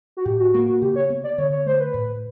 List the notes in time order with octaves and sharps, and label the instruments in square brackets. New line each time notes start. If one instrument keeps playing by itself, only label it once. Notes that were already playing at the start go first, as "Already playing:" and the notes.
[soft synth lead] F#4
[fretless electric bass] A2 [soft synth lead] G4
[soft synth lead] F#4
[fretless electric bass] A#3 [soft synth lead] F#4
[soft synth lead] F#4
[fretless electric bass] C#3 [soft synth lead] G4
[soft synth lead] C#5
[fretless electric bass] B3
[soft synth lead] D5
[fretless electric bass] D3 [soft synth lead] C#5
[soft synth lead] C#5
[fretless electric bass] A3 [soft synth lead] C5
[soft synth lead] B4
[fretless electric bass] A2